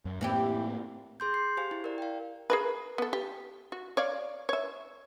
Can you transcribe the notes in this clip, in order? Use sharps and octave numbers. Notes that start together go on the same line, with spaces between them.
F#2
A2 E3 A#3 C4 E4 G4
G#4 C6 G6
C7
G4 C5 F5 G#5
E4
A#4 D5
F5 G5
G#4 A#4 B4
B3 A4
G4
F#4
C#5 D5 F5
C#5 E5